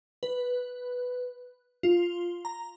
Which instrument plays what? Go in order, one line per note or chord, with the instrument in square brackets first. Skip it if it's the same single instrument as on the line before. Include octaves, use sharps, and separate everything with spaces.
[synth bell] B4
F4
A#5